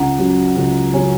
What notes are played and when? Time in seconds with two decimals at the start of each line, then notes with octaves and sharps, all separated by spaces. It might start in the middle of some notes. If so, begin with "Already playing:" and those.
Already playing: C#2 F#5 A#5
0.18 C#3 F#3 C#4
0.56 C#2
0.94 C#3 F#3 C#4